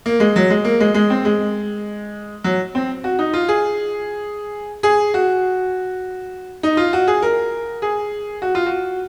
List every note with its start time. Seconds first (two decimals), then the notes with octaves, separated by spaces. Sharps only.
0.06 A#3
0.20 G#3
0.36 F#3
0.50 G#3
0.65 A#3
0.80 G#3
0.94 G#3
1.10 C4
1.25 G#3
2.44 F#3
2.75 C4
3.04 F#4
3.19 D#4
3.33 F4
3.48 G#4
4.83 G#4
5.14 F#4
6.63 D#4
6.77 F4
6.93 F#4
7.07 G#4
7.22 A#4
7.82 G#4
8.42 F#4
8.55 F4
8.66 F#4